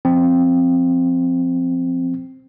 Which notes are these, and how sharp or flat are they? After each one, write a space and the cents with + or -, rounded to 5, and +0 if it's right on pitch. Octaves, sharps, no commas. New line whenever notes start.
F3 +0 C4 +0